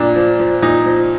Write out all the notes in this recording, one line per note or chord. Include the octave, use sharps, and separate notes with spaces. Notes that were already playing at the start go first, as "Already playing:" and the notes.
Already playing: A#2 D4
F3
F3
A#2 D#4
F3